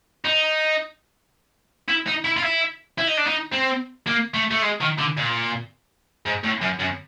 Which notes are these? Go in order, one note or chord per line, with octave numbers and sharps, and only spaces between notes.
D#4
E4
D#4
E4
F4
E4
E4
D#4
D4
D#4
C4
A#3
A3
A3
G#3
D#3
D3
A#2
G#2
A2
F#2
F#2